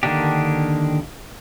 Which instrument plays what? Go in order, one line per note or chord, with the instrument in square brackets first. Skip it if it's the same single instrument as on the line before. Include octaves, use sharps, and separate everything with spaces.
[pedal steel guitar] D3 D#3 A#3 D4 G4